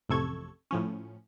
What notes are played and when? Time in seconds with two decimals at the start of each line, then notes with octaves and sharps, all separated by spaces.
0.09 A1 F2 C3 A4 C#6 G#6
0.71 A2 F3 C#4